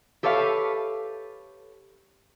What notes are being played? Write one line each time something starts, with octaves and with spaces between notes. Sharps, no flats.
G4 A4 B4 C#5 E5 F5